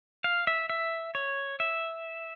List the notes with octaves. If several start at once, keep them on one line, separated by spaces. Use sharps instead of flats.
F5
E5
E5
C#5
E5